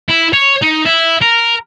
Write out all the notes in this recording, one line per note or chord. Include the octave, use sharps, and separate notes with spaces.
E4
C#5
D#4
E4
A#4